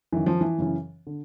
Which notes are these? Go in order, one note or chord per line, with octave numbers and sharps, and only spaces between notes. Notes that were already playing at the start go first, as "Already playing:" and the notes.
F#2 D#3 E3
F3
E3
F#2 C#3 E3
D3